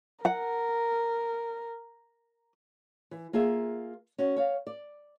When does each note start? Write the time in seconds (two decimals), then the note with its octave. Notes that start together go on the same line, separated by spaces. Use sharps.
0.25 A#4 F#5
3.11 E3
3.33 A#3 F4 G#4 A#4 E5
4.18 C#4 F#4
4.36 C#5 F5
4.67 D5